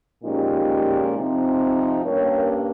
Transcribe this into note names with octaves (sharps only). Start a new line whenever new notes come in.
A#2 F3 G#3 C#4 D#4 G4
C3 F3 C4 D#4
G2 G3 A#3 C#4 A#4 C#5